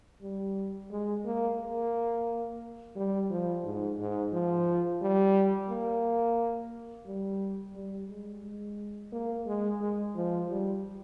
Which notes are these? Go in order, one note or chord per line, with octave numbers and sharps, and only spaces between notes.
G3
G#3
A#3
A#3
G3
F3
G#2
G#2
F3
G3
A#3
G3
G3
G#3
G#3
A#3
G#3
G#3
F3
G3